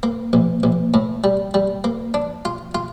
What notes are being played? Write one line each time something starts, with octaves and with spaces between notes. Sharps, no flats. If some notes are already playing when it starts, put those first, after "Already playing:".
A#3
A#1
A#1
A2
G3
G3
A#3
D4
F4
F4